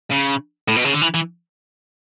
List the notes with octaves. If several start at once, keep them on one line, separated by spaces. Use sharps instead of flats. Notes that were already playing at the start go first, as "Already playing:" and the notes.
C#3
A2
B2
C#3
D3
E3
E3